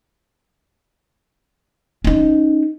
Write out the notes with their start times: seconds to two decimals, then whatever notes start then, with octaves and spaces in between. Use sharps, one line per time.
2.04 C#4 D#4